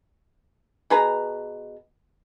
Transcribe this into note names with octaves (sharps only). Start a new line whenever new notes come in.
B2 G#4 B4 A#5